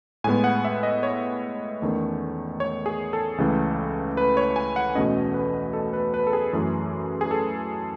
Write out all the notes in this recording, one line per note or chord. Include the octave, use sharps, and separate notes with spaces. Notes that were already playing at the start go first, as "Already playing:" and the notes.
A2 G#3 B3 G#5
F#5
E5
D#5
C#5
E2 D#3 A3 C#4
C#5
G#4
A4
C#2 C#3 E3 A3
B4
C#5
G#5
F#5
E2 B2 A3 C#4 D#5
B4
A4
B4
B4
A4
G#4
F#2 E3 A3
G#4
A4